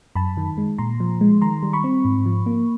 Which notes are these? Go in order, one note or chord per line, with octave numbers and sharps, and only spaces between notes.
F#2 A5 B5
D#3
G#3
A#2 A#5 C6
F3
G#3
D#3 A#5 C6
G3
B5 C#6
C4
G#2
F3
A#3